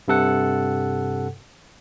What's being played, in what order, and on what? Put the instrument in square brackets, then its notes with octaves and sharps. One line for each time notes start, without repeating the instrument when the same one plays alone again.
[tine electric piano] G2 C3 A4 F#5